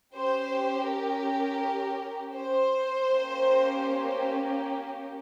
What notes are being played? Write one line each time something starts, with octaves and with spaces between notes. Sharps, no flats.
C#4 G4 C5
A#4
C5
A#3 C#4 G4